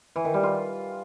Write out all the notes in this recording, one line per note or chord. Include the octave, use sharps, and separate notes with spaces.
E3
D#3
G3
F4